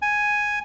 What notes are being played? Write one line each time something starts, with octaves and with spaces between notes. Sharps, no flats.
G#5